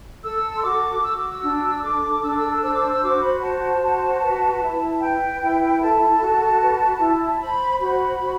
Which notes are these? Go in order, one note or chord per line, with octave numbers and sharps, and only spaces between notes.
A4 E6
C6
F#4 D6
F#4 E6
D6
E6
D4
A4 D6
D4 E6
D6
E6
C5 E6
D6
E6
E6
F#4 D6
B5
C5 A5
F#4
B4
E4
B4 G5
E4
A4 A5
F#4
B4
E4
C5 B5
F#4 B5
F#4